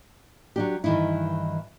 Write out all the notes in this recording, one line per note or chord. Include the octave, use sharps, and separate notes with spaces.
F#3 D4 G4
G2 D#3 E3 D#4 E4